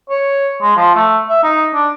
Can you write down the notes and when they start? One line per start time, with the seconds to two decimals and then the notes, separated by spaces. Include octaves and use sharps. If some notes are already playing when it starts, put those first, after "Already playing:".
0.10 C#5
0.62 G#3
0.77 F3
0.95 A3
1.29 E5
1.44 D#4
1.74 D4